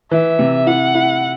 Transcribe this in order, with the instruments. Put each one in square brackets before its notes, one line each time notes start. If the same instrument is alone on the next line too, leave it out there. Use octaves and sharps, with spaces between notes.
[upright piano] E3 [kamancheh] E5
[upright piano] C3
[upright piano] E4 [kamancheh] F#5
[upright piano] E4